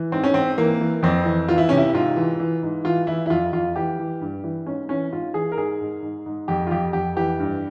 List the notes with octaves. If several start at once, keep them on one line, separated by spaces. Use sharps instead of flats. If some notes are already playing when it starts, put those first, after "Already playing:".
Already playing: E3
G#2 C4
C#4
G#2 C4
E3 A#3
E3
F2 C4
E3
E3 F4
E4
C3 C#4
E4
G#2 F4
E3
E3
G#2
E3 F4
E3 E4
E4
F2 F4
F2 F4
E3 G4
E3
G2
E3
G#2 C#4
E3 C#4
G#2 F4
E3 G#4
A#4
G#2 G#4
G#2
G#2
G#2
F2 G4
F4
F2 G4
F2 G4
E3 G4
G2